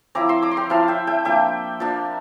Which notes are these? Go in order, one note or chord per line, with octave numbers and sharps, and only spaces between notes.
F3 C4 E4 A#5 D6
C6 E6
A#5 D6
C6
G5 A#5
F3 C4 E4 F5 A5
E5 G5
E5 G5
F3 A#3 D4 E5 G5
F3 A#3 D4